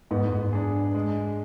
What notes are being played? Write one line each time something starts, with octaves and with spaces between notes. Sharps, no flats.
G#2 B3
G#2
D4 G#4
G#3